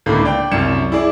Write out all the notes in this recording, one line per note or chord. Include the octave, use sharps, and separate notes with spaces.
C#2 A2 D3 A#3
D5 G5
C2 F#2 C#7 E7
E4 G#4 D5